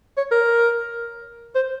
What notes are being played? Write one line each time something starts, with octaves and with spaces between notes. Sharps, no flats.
C#5
A#4
C5